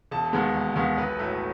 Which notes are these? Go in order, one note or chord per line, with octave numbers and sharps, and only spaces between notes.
E1 A5
D#2 D#3 G#3 B3
E1
D#2 D#3 G#3 B3
B1 B4
A2 F#3 A3